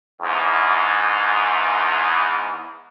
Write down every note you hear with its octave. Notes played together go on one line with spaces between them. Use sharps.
E2 G#2